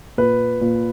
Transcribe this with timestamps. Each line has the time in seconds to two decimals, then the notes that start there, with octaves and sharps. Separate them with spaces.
0.18 A#2 B4
0.61 A#2